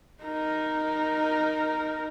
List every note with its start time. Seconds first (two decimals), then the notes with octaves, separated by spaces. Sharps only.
0.23 D#4 A#4